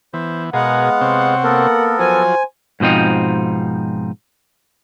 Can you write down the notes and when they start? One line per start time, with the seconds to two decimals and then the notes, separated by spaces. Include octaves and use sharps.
0.14 E3 B3 C5
0.53 B2 G#3 B3 G#4 A#4 F5 F#5
1.01 C3 C4 C#5
1.44 A#3 B3 A4 A#4
1.99 F3 F#3 C5 G#5
2.80 G#2 B2 F3 C4 D#4